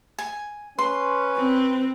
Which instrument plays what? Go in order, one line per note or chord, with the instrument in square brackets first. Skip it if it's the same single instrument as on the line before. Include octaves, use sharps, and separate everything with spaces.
[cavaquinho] G#5
[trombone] C#4 [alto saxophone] B4 [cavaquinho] C6
[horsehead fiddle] C4